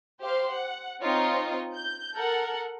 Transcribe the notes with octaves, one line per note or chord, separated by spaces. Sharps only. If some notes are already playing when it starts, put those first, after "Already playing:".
G4 C5 F5 C6
F#5
C4 D#4 F4 C#5 D#5
G6
A4 A#4 F#5